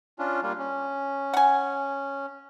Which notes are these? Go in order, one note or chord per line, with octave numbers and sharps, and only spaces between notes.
C#4 D4 F4
G3 A#3 F4
C#4
F#5 G#5